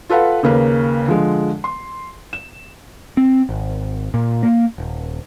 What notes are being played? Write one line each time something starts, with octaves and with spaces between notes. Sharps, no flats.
F4 A4 B4 F5 F#5
D#2 C#3 A#3 B4
D3 F3 G#3
C6
E7
C4
G#1
A#2
A#3
D#1